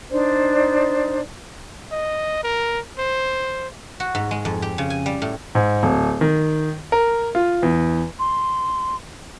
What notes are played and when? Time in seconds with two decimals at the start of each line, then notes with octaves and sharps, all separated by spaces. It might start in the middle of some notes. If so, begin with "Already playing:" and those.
0.11 D4 D#4 C5 D5
1.92 D#5
2.43 A#4
2.98 C5
4.00 F#4
4.15 G#2
4.31 G#3
4.45 F2
4.62 G4
4.78 C#3
4.90 G#5
5.06 G3
5.22 A2
5.55 G#2
5.83 D1
6.21 D#3
6.92 A#4
7.35 F4
7.63 E2
8.19 C6